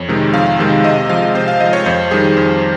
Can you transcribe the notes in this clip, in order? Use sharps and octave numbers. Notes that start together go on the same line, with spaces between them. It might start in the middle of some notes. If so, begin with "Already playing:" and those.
Already playing: F2 C#5
C3 D#3 G#3
F2 F5
C3 D#3 G#3
C3 D#5
F3 G#3 F5
C3 C5
F5
F3 G#3 D#5
C#5
F2 C5
D#3 G3 G#4
F2 C5